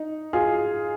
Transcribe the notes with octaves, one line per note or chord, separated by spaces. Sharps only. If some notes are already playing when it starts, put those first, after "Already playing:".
Already playing: D#4
F4 G#4